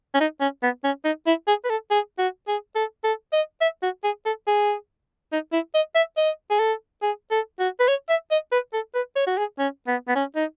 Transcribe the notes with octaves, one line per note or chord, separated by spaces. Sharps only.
C#4
D#4
C#4
B3
C#4
D#4
E4
G#4
B4
A4
G#4
F#4
G#4
A4
A4
D#5
E5
F#4
G#4
A4
G#4
D#4
E4
D#5
E5
D#5
G#4
A4
G#4
A4
F#4
B4
C#5
E5
D#5
B4
A4
B4
C#5
F#4
G#4
C#4
B3
B3
C#4
D#4